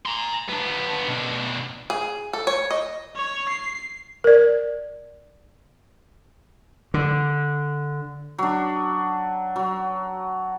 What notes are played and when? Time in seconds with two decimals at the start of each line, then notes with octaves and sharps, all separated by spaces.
0.06 A#5 C6
0.49 B3 D4
1.08 B2 D4
1.90 G#4
2.33 A4
2.47 C#5
2.71 D#5
3.16 C#5
3.48 C7
4.24 A#4 D5
6.94 D3
8.38 F#3 D4
9.56 F#3